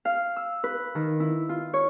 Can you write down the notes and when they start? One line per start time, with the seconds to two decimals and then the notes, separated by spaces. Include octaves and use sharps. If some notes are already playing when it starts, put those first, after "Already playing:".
0.05 F5
0.36 E6
0.64 B4
0.95 D#3
1.20 E4
1.49 F4
1.73 C#5